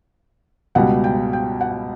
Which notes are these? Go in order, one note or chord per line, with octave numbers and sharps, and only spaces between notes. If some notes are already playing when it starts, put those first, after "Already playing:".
C#2 B2 G3 F#5
G5
G5
F#5